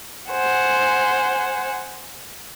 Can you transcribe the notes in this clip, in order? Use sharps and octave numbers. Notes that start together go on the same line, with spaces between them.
C5 F#5 G#5